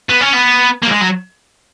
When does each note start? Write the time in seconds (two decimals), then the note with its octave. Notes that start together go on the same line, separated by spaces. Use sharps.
0.09 B3
0.21 C#4
0.33 B3
0.83 A#3
0.87 F#3
0.92 G#3
1.01 F#3